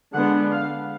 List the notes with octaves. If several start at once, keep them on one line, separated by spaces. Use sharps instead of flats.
D3 G#3 B3 D4 F#5
F5